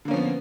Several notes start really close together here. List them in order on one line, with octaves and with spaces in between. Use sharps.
D3 A#3 C#4 F3 B3